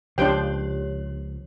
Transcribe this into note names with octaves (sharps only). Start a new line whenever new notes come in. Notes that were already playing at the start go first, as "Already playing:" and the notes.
C#2 F3 D4 G4 C5 C#5 G5